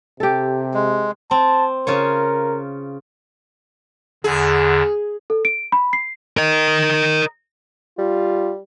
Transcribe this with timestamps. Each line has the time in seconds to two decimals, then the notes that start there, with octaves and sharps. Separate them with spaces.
0.20 C3 G4 A4
0.74 G#3
1.31 C4 A5
1.87 C#3 F4 A#4 C#5
4.24 E2 D3 G#4
5.30 A4
5.45 D7
5.72 B5
5.93 C7
6.37 A#4 D#5
7.99 G3 F4